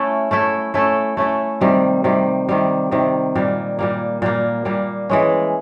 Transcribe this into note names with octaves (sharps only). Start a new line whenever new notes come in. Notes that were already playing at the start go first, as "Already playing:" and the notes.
Already playing: A3 C#4 E4 A4
A3 C#4 E4 A4
A3 C#4 E4 A4
A3 C#4 E4 A4
C3 D#3 G3
C3 D#3 G3
C3 D#3 G3
C3 D#3 G3
A#2 G3 A#3
A#2 G3 A#3
A#2 G3 A#3
A#2 G3 A#3
E3 G#3 C#4